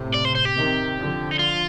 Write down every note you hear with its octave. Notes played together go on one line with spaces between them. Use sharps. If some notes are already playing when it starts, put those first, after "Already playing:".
Already playing: A2 C3
D5
C5
C5
G4
C3 D#3
D3 F3
D#4
F4